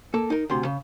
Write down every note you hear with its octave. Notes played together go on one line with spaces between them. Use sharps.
A#3 A4
D#4 A#4
D2 C3 C6
C#3